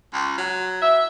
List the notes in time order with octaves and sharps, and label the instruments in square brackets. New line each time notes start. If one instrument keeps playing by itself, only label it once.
[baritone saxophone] C#2
F#3
[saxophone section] E5